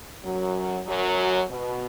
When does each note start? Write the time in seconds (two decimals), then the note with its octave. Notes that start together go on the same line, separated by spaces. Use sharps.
0.24 F#2 F#3
0.86 F#2 F#3
1.49 B2